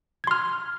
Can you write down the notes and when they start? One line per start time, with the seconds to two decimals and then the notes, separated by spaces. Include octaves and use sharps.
0.24 G#6
0.27 C6
0.31 F6